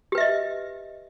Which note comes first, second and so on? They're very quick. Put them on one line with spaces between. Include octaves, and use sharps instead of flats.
G4 B4 E5 D#5